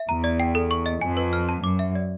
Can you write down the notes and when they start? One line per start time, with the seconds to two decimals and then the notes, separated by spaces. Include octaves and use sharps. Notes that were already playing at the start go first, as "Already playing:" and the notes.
Already playing: E5
0.08 E2 A#5
0.24 D5
0.40 G5
0.55 A4
0.71 C#6
0.86 D#5
1.01 F2 G#5
1.17 B4
1.33 F6
1.49 A5
1.64 F#2 D6
1.79 E5
1.95 D5